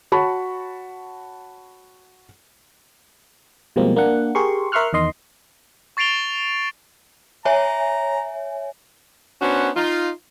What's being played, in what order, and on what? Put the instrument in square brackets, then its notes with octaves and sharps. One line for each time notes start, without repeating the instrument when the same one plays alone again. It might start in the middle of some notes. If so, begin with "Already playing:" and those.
[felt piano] F#4 C#5 A5 B5 C#6
[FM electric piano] B2 F3 G3 G#3 A#3 C4
A#3 D4 F#5
G4 G#4 A#4 C6 C#6
A#4 E5 C6 C#6 F6 F#6
E2 D#3 D#5 C6
[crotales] C#6 A6 C7 D7 F7 G7
[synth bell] C#5 E5 G#5 [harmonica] A#5
[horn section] B3 C#4 D4 F#4 C5
D#4 F4